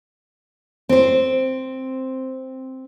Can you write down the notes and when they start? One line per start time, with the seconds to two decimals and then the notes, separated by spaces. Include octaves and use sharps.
0.89 C4 C5